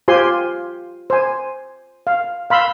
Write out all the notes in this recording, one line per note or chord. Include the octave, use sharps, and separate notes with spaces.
F4 G4 C5 G#5 C6
C5 G#5
F5
F5 B5 C6 E6